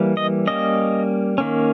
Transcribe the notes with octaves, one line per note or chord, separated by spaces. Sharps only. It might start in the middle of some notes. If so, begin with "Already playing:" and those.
Already playing: E3 G3 A#3
D#5
G3 A#3 C#4 D#5
D#3 A#3 C#4